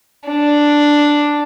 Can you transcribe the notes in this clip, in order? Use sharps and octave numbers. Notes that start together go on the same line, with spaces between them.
D4